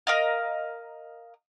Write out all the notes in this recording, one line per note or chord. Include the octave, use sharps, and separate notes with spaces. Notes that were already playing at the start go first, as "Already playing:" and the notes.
A#4 D#5 F5